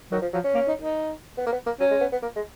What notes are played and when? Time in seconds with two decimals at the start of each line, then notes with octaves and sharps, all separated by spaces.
0.11 D#3 F#3
0.22 F3
0.33 F3 F#3
0.44 C#4
0.54 A#3
0.68 D#4
0.82 D#4
1.38 B3
1.46 A#3
1.52 B3
1.66 A#3
1.80 F#3 C#4
1.91 G#3
2.01 B3
2.12 B3
2.22 A#3
2.36 G#3